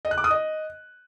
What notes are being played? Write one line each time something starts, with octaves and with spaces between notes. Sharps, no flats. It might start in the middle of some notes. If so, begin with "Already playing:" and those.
D#5
F#6
D6
D#6
D#5